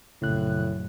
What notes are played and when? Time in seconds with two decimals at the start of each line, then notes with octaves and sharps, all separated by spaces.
0.22 A#1 F#2 A2 C#3 F#6